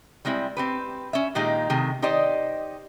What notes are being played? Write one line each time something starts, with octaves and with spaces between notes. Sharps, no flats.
G3 G#3 C4 E4
C4 G4 B4
C#4 E5
A#2 D#3 G#3 D#4 G4
C3 D#3 A3 G#4
D#4 G4 C5 D5 D#5